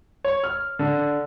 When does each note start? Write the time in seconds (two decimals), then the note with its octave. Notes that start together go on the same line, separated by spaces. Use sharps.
0.24 C#5
0.44 F6
0.79 D3